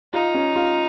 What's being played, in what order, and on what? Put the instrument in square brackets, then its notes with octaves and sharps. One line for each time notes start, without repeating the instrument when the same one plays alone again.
[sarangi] D#4 [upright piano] F4
[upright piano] C#4
F4